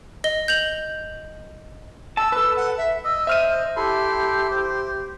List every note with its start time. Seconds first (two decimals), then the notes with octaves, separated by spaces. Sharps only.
0.24 D#5 G7
0.48 G6 F7 F#7
2.17 A5 E6
2.32 A4 B4
2.56 F#5
2.78 E5
3.05 D#5 E6
3.27 C5 E5 F6 D#7
3.77 E4 G4 A4 C6
4.51 C5